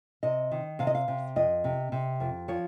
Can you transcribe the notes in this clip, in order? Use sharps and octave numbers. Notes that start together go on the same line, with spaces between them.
C3 D#5
D#3
C3 F5
D#5
F5
C3
F2 D#5
C3
C3
F2
F3 C#5